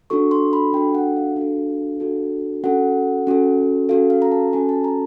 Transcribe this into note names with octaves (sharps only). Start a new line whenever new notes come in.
D4 F#4 A4 C#6
C6
B5
D4 F#4 A4 G5
F#5
F5
D4 F#4 A4
D4 F#4 A4
C#4 F#4 A4 F#5
C#4 F#4 A4
C#4 F#4 A4 F5
F5
A#5
A5
C#4 F#4 A4 G#5
A5
A#5